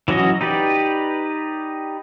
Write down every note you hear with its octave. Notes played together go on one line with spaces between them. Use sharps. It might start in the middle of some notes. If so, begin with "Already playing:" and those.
E3 F#3 C#4 F#4 D#5
D#4 G4 B4 D5